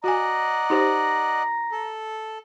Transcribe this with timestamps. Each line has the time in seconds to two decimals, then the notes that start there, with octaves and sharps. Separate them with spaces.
0.04 F#4 D5 D#5 F#5 G#5 A#5
0.70 D#4 G4 C5
1.72 A4